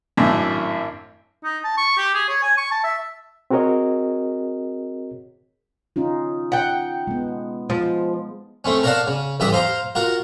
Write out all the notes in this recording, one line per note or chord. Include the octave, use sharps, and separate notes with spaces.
G#1 F#2 A2 D4 E6
D#4
A5
C#6
G4
G#4
C#5
G#5
C#6
A5
E5
C4 F#4 G#4 A#4 C#5 D#5
C#4 D#4 F4
F#5 G5
G#3 B3
F3 G#3
A3 C4 C#4
A#4 C#5 D5 F5 F#5 A5
C#3
A1 G2 E3 G4 E5 D#6
C5 F5 A#5 C6
F4 F#4 A#4